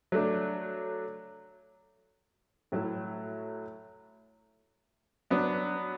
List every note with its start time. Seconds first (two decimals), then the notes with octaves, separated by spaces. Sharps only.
0.12 F#3 A3 D4
2.72 A2 F#3 A3 E4
5.30 F#3 B3 D4